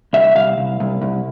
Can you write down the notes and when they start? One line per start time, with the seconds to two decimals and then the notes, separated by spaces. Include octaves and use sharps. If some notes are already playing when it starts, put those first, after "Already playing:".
0.13 C2 E5
0.35 C2 F5
0.58 C2
0.80 C2
1.02 C2